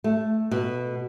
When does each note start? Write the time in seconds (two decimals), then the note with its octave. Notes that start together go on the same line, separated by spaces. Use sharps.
0.04 A3
0.51 B2